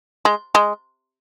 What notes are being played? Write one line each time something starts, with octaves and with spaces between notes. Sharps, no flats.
G#3
G#3